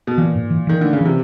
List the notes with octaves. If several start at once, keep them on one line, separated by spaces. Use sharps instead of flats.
B2
A#2 E3
G#2
E3
D#3 E3
D3 A3
C#3
C3 E3